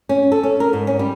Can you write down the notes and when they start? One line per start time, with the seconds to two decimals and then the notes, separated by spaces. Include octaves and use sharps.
0.09 C#4
0.32 A4
0.43 C#4
0.60 A#4
0.73 G#2
0.87 C#4
0.99 G3